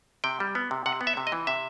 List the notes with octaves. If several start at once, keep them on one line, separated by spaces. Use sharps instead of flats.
C3 G5
G3
B3
C3
C3 F#5
B3
E5
C3
D#5
E3
C3 E5